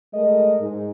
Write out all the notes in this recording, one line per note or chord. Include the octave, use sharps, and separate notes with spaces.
G#3 A3 A#4 D#5
G#2